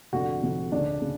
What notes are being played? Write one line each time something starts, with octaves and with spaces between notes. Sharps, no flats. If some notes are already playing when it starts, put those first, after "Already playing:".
F1 F2 D3 F#4
F1 F2 D3
D2 C#3 D4
C#3